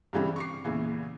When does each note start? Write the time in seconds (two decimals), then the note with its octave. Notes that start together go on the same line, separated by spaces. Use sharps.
0.13 G2 C#3 E3 G3 C4
0.36 C#6 D6 C7
0.65 E2 A#2 C#3 E3